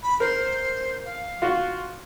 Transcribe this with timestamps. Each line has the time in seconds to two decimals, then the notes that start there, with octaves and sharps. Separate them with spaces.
0.03 B5
0.20 A#4 C5
1.05 F5
1.42 F4 F#4